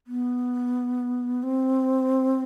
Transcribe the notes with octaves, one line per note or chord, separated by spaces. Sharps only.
B3
C4